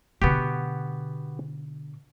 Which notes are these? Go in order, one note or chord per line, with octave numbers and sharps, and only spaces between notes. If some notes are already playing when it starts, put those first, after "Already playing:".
B2 D3 B3 F#4 G4